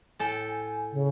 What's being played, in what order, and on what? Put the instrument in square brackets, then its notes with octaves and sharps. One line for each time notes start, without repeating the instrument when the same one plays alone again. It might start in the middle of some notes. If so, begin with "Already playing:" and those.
[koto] A2 A4 G5 [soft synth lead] G#5
[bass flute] C#3